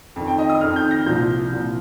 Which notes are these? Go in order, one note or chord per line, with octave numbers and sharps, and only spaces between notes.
F2 D#3
G5
D#5
D#6
F2 D#3 F6
G6
A#6
C2 A#2 F3 G6
C2 A#2 F3